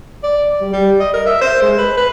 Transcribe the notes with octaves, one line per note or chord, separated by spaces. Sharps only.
D5
G3
G3
D#5
A#4
E5
C5
G#3
B4
B4